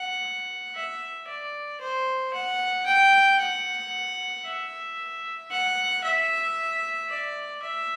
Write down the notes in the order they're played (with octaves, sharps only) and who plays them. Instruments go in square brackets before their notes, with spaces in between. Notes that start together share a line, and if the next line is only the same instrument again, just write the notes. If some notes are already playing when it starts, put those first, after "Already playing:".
Already playing: [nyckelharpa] F#5
E5
D5
C5
F#5
G5
F#5
E5
F#5
E5
D5
E5